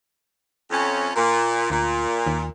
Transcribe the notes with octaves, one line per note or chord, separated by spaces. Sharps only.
F2 C#4
A#2
D2 A#2
D#2